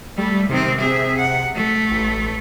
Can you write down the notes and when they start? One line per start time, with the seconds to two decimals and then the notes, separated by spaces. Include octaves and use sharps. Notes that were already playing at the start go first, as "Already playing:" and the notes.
0.18 G3 A3
0.49 C3 D#3 C4
0.80 G#4 E5
1.18 F#5
1.55 A3
1.91 A1